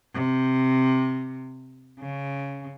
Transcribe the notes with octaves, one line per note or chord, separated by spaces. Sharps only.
C3
C#3